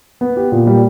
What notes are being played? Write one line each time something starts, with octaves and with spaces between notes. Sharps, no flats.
B3
G4
A#2
G3